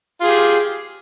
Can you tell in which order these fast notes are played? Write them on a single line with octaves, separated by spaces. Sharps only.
F4 G#4 G4